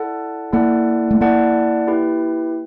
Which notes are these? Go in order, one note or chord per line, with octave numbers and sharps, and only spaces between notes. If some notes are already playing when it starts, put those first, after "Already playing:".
Already playing: E4 A4 D5 F#5 A5
A#3 E4 A4 D5 F#5 A5
A3
A#3 E4 A4 D5 F#5 A5
E4 G4 B4